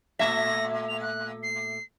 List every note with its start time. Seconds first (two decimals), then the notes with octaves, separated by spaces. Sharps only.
0.19 A#2 A3 E5 A#6
0.88 F7
1.02 F#6
1.43 C7